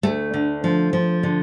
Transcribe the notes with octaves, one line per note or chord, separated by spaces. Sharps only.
D2 A3
D3
F3
F3
D3